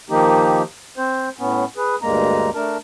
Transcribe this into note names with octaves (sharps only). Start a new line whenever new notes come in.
D#3 F3 A#3 D#4 G4
C4 C5
A2 B3 C#4
G#4 B4
D2 G2 G#3 A#3 A#5
A3 D4 A#4 A5